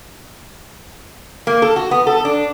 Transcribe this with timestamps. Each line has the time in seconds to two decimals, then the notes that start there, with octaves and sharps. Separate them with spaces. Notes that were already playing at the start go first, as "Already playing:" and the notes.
1.47 A#3
1.62 A4
1.76 F#4
1.91 B3
2.07 A4
2.25 D4